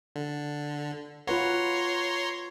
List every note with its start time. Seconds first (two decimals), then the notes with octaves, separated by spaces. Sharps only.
0.16 D3
1.27 F4 B4 C#5 F#5 A#5 C6